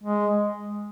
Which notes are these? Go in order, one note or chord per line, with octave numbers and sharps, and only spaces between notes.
G#3